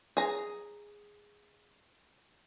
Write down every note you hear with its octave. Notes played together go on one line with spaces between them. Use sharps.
G#4 A#5